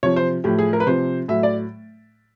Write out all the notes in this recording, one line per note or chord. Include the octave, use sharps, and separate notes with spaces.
C3 F3 C#5
C5
A2 F3 G4
G#4
A#4
B4
C3 F3 C5
A2 F#3 E5
D5